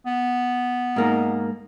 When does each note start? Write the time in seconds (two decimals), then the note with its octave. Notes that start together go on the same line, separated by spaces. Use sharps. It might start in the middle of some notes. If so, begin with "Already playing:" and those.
0.06 B3
0.96 G#2 A#3 D#4